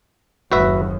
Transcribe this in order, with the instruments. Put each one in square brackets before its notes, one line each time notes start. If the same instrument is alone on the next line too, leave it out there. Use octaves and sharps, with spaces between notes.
[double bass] F#1 D#2 [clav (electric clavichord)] F#4 B4 E5